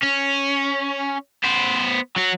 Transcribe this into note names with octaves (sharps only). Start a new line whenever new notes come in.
C#4
B3 C5
F#3 F#4